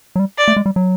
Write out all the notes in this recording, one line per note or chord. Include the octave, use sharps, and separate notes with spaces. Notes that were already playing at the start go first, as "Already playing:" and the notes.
F#3
G3
D5
A3
G#3
G3
F#3